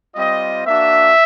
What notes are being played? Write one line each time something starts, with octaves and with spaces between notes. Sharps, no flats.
G3 C4 F4 D#5
A#3 D4 F#4 E5